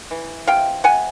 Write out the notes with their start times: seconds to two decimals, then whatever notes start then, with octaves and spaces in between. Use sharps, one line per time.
0.11 E3
0.47 C3 F5 G5
0.84 C3 F#5 G#5